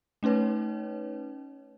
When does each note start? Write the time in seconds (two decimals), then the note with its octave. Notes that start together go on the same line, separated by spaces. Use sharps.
0.23 A3 C#4 D#4 B4 C#5